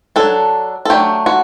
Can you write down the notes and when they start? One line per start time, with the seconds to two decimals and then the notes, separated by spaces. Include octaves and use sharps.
0.16 F#3 A#3 D4 A4
0.85 A4
0.90 F#3 A3 D4 G4
1.26 F#4